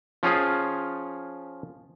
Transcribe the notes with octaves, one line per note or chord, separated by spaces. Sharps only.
F3 C#4 F4 G#4